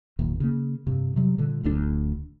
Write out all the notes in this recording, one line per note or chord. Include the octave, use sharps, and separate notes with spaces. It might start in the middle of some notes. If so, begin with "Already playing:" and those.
F#1 D#2 A#2
C#3 A#3
G2 C3
C3 F#3 G3
A#2 D3 G3
D1 D2 G#3 D4